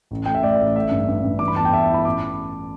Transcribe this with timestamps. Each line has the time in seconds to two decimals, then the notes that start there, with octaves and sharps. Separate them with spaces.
0.11 A1
0.26 A3 G5
0.34 E5
0.43 A2 D5
0.60 A1
0.75 A3 E5
0.91 G2
1.08 G2
1.24 G2
1.39 E3 D6
1.48 B5
1.56 E2 A5
1.65 G5
1.73 E2 E5
1.89 E4 B5
2.05 A1 D6